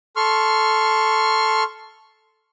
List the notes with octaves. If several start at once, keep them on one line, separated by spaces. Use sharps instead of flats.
A4 C6 C#6 F6